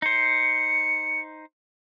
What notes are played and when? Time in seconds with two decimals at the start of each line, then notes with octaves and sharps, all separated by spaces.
0.02 D#4 C5 C#7